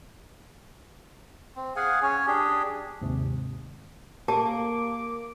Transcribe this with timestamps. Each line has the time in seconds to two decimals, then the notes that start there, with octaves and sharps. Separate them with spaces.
1.56 C4
1.76 G#4 F5 F#5 G#5
2.03 C#4 C#5 G#5
2.27 D4 G4 G#4
3.01 D#2 G#2 C3
4.28 A#3 G4 A5 D6